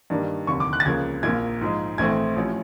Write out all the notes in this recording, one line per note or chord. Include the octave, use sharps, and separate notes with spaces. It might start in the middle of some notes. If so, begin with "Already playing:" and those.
G2 D#3 G3 A#3 D4
F1 D#2 D3 C#6
D6
F#6
A6
C#2 C#3 F3 A#3 G#6
A#1 A#2 F3 A#3 G#6
G#2 F3 G#3
A#1 A2 E3 A3 C4 G#6
A1 A2 F3